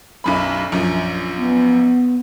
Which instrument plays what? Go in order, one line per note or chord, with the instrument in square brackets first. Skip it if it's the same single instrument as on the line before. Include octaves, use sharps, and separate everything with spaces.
[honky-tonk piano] B1 F#2 B5
A#1 F#2
[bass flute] B3